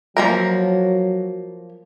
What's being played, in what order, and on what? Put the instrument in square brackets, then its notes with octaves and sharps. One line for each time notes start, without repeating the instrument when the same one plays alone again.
[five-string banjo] F3 A#3 A#4 [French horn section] F#3